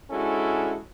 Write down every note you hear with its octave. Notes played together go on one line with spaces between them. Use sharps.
G#3 C#4 D4 E4 F#4 A4